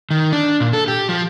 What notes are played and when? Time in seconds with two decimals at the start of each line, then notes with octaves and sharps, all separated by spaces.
0.11 D#3
0.32 D4
0.60 A#2
0.73 A4
0.88 G4
1.09 F3